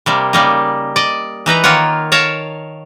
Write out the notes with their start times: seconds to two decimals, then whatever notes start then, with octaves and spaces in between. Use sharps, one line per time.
0.06 C3 G3 A#3
0.33 C#3 G3 A#3 D#4
0.96 D5 D#5
1.46 E3 D#4 B4 A#5
1.64 D#3 A#3 F4 C#5 F#5
2.12 A#4 C#5 F5 A5 A#5